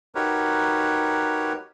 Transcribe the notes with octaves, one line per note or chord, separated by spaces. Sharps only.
D#4 F#4 G4 A#4 B4 C#5